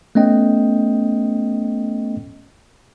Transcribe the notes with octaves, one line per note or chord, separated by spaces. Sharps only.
A3 B3 C#4 D#5 G5